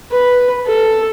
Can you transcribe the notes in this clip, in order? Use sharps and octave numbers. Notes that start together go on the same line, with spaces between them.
B4
A4